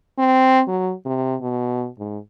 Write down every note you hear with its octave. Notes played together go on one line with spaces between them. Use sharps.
C4
F#3
C3
B2
G#2